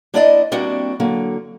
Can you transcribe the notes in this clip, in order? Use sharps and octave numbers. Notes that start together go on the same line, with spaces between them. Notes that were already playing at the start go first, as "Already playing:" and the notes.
A#3 D4 E4 C5 D5 D#5
G3 A#3 C4 D4 E4 F#4
D3 F#3 A#3